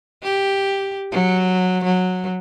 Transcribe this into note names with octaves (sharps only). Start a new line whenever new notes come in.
G4
F#3
F#3